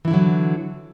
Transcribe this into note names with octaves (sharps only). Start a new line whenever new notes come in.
D3 E3 F#3 E4